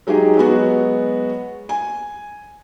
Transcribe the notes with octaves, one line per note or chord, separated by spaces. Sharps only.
F#3 G#3 D#4 G4 G#4
F#3 G#3 B3 F#4
G#5